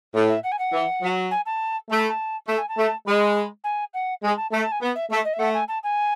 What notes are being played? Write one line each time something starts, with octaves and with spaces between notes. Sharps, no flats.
A2
E5
F#5
G#5
F#5
E3
F#3
G#5
A5
A3 A5
B5
A5
A3 A5
G#5
A5
A3
G#3 B5
G#5
F#5
G#3 G#5
A5
A3 A5
A5
G#5
B3
E5
A3 E5
D#5
E5
A3 F#5
G#5
A5
G#5